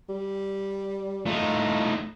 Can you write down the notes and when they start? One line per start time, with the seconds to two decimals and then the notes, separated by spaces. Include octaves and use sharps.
0.09 G3
1.26 A2 D#4 F4